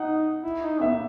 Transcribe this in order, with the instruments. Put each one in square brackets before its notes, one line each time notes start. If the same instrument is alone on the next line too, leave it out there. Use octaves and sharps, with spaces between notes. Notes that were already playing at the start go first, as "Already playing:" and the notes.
Already playing: [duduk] D#4 [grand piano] F#5
[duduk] E4
D#4
[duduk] B3 [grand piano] E5
[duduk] A#3